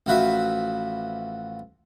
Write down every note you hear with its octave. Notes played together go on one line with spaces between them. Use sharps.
A1 F3 F#4 B4 E5